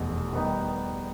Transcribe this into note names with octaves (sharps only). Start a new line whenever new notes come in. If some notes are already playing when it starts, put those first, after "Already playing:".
Already playing: F1 E2 B2
D#3 G3 B3 D#4